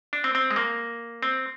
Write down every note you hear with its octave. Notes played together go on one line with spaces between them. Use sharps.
D4
C4
C4
G#3
A#3
C4